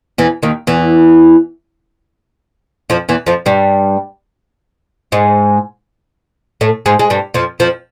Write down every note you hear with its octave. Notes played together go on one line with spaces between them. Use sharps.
E2 E3
D#2 D#3
E2 E3
F2 F3
E2 E3
F2 F3
G2 G3
G#2 G#3
A2 A3
G#2 G#3
G#3
G2 G3
F2 F3
F2 F3